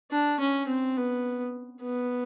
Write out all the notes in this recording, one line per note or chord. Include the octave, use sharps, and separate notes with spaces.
D4
C#4
C4
B3
B3